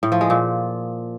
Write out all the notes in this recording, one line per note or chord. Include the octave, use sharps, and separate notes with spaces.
A2
F3
G#3
A#2